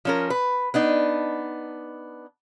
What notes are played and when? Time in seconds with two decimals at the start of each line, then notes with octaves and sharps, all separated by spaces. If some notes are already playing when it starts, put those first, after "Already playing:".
0.05 F3 C#4 A#4
0.30 B4
0.74 B3 D4 D#4